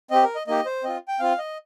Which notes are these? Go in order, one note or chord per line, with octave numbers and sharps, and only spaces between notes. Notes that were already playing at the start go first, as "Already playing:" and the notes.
C4 G4 D#5
A#4
D#5
A#3 D#4 G4 D#5
C5
C4 F4 D#5
G5
C4 F4 F5
D#5